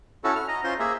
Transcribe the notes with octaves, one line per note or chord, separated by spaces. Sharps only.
C#4 E4 F#4 A4
F6
D#5 A#5
C#4 F4 C5 C6
A#3 G#4 E5